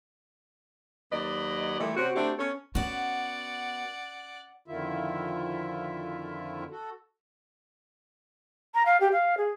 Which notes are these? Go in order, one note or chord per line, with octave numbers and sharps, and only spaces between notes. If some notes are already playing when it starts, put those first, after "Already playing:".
D#2 F#3 B4 D5 D#5
A#2 E3 G3 A3
C3 C4 C#4 F#4
A3 C4 D4 E4 F#4 G4
B3 C#4 A4 C#5
B3 C#4 F#4 D5 F#5
F2 D3 D#3 E4 F4 E5
F#4 A4
A#5
F5
G4
F5
G#4